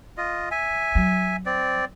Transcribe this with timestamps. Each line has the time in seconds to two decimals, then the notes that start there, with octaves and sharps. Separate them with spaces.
0.18 F4 D#5
0.51 E5 G#5
0.95 F#3
1.46 C4 D5